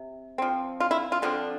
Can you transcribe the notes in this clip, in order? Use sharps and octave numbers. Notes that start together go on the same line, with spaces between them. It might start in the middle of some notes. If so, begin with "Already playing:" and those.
Already playing: C3
F3 C4
F4
E4
F4
D3 F3 C4 D4